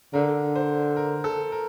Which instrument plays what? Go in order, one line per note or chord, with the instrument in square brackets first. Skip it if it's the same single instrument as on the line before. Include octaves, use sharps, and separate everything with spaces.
[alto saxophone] D3 [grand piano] A#4
[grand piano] C5
A#4
A4
A#4